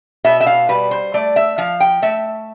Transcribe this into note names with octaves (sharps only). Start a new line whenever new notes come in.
B2 E5
E5
F5
G3 B4
C5
A3 D5
E5
F3 F5
G5
A3 E5